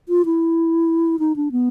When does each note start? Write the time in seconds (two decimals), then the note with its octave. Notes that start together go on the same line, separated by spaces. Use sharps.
0.09 F4
0.25 E4
1.19 D#4
1.36 D4
1.52 B3